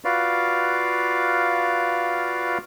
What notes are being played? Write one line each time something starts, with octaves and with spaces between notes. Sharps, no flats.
F4 F#4 B4 D5 F5